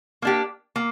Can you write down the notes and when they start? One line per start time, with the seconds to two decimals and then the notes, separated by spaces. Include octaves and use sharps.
0.22 A#3 D4 G4
0.76 A#3